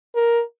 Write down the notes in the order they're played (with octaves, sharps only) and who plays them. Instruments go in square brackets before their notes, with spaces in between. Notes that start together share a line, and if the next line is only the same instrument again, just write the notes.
[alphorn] A#4